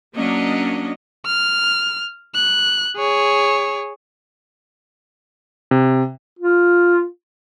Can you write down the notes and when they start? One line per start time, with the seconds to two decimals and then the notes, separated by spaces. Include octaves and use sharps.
0.15 F#3 A#3 C#4 D4 D#5
1.26 F6
2.35 F#6
2.96 G#4 C#5
5.71 C3
6.39 F4